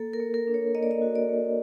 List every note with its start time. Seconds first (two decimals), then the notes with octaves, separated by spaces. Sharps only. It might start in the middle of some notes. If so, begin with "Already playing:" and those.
Already playing: A#3 A4
0.13 A#4
0.20 A#3
0.34 A#4
0.47 D4
0.54 C#5
0.75 A#3 D#5
0.83 D5
0.91 D#5
1.02 F#4
1.16 D5
1.29 A#3